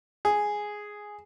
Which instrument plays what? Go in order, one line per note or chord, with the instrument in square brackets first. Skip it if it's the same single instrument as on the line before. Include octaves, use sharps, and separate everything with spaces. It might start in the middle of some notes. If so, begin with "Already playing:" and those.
[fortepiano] G#4